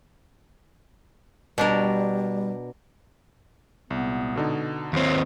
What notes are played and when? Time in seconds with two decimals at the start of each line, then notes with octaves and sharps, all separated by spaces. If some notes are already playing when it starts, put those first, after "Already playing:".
1.58 B2 G3 D4 A#4
3.90 C2 A#2 G#3 B3
4.36 B2 D3 D#4
4.93 D#2 C4 B4 C#5